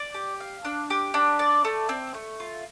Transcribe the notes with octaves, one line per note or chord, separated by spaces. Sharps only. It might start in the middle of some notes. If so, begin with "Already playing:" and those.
Already playing: D5
G4
F5
D4
G4
D4
D5
A3
C4
A3
F4